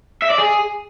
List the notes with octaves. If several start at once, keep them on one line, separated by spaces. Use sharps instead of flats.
E5
D5
G#4